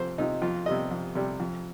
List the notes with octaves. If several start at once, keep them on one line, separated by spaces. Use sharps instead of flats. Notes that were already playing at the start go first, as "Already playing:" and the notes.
Already playing: F2 C3 F3 C5
C3 F3 D#4
F2 F4
C3 G3 D#5
F2
C3 G3
F2